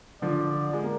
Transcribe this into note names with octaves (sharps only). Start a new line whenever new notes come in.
D3 F3 D5
G#3
A#3